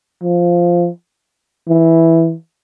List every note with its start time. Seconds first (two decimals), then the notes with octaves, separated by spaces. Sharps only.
0.22 F3
1.69 E3